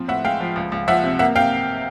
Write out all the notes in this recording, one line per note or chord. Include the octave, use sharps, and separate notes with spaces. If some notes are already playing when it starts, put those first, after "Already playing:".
Already playing: F3 C4
A2 E5 F#5
G#3 F5 G5
F3
C#2
C#2
F3 E5 F#5
C3
A#3 E5 F#5
C3 F5 G5